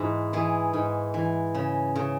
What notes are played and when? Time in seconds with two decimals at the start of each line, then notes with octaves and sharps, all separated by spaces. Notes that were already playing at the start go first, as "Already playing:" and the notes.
Already playing: G#2 E3 B4
0.33 E3 G#4
0.73 G#2
1.14 E3
1.55 C#3
1.95 C#3